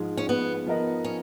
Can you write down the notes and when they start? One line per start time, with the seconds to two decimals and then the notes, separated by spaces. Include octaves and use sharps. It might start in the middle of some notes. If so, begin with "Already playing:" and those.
Already playing: G#2 F3 G#3
0.17 C#4
0.29 B3
0.66 F3 B3 D#4 A#4 D#5
1.05 C#4